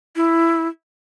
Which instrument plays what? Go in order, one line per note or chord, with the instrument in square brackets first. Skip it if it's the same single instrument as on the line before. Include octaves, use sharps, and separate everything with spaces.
[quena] E4